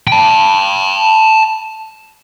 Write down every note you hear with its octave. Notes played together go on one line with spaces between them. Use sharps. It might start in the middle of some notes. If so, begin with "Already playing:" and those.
G5 A5